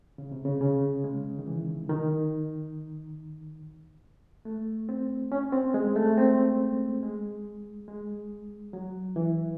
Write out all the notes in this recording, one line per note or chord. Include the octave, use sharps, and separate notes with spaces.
C#3
C3
C#3
C#3
G#3
D#3
E3
D#3
A3
C4
C#4
C4
G#3
A3
C4
G#3
G#3
F#3
E3